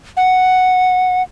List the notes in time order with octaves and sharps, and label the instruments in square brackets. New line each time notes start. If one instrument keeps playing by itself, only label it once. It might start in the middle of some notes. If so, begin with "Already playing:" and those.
[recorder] F#5